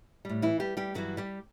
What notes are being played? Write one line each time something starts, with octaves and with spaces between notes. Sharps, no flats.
A2 G3
E3 E4
G3 G4
G3 G4
G2 E3 F#3 G3 F#4
G3 G4